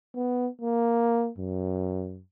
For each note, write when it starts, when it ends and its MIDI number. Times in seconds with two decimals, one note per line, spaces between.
0.15 0.48 59
0.62 1.30 58
1.38 2.22 42